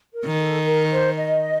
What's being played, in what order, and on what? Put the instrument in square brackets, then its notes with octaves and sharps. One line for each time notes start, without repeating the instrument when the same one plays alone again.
[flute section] A#4
[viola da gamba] D#3
[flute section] A4
A#4
C5
D#5